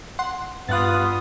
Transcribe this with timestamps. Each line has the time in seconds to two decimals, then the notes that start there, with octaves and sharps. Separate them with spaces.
0.19 F#5 C6
0.69 G2 B3 F4 D#6 F#6 A6